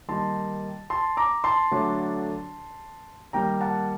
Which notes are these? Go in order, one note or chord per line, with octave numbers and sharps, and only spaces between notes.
D#3 G3 A#3 D#4 A5 C6
A5 C6
A#5 D6
A5 C6
D3 F#3 A3 D4
D#3 G3 A#3 G5 A#5
F#5 A5